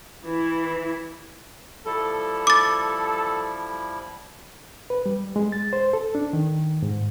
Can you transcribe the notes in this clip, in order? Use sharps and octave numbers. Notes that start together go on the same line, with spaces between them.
E3 E4
F3 G3 E4 A4
D6 A6
B4
G3
G#3
A6
C5
A4
D4
D#3
G#2